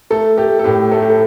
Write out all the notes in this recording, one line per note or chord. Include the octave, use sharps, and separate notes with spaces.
A3 A4
A3 G4
A4
A2 G4
A3 A4
G4
A4